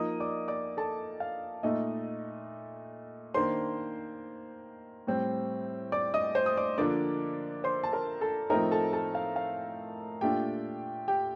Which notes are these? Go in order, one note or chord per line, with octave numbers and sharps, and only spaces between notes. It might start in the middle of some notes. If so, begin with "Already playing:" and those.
Already playing: F3 A#3 D#4 D#5 D#6
D5 D6
D5 D6
A4 A5
F5
A#2 A3 D#4 D#5
D#3 A#3 D4 C5 C6
A2 G3 C4
D5 D6
D#5 D#6
C5 C6
D#6
D5 D6
D3 F3 A#3 D4 D5 D6
C5 C6
A5
A#4 A#5
A4 A5
A2 F3 A3 C4 D#4 A#4 A#5
A4 A5
A4 A5
F5
F5
A#2 A3 D4 F4 G4 G5
G4 G5